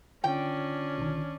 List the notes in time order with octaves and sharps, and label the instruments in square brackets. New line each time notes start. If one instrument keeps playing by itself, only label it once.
[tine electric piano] D3 F4 [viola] C#4 D4 [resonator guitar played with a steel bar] G5
[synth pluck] B1 D#3